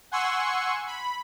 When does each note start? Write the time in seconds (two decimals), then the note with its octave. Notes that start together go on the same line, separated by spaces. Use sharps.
0.12 F#5 G#5 C6 C#6 E6 C#7
0.87 B5